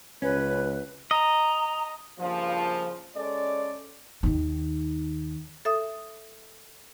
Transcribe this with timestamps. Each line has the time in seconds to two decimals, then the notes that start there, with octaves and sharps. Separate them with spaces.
0.22 C#2 C#4 B4
1.11 D#5 A#5
2.19 G2 A#2 C#3 F3
3.16 G#3 C#4 A4 D5
4.23 D#2 D#3
5.65 A4 E5 D#6